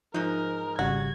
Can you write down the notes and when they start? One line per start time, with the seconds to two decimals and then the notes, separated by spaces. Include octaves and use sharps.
0.14 G#2 F3 D#4 A#4
0.79 G#1 C#3 G3 F#4 G#6